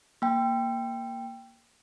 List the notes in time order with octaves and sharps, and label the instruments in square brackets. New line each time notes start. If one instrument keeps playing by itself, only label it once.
[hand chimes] A#3 G5